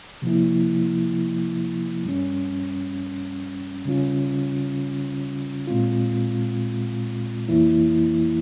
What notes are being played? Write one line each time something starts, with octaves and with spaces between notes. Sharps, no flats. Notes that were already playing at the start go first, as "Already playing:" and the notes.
C3 F3 A#3 E4
G2 G3 C#4
C#3 G3 C#4 F4
A#2 G#3 C4 F4
F2 E3 A#3 E4